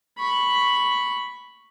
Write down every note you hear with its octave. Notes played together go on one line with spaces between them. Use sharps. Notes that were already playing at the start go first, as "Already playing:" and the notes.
B5 C#6